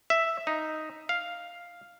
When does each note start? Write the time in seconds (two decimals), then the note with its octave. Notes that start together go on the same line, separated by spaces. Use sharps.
0.10 E5
0.47 D#4
1.09 F5